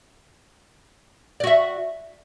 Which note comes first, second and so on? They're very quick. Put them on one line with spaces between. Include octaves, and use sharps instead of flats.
D5 F#4 E5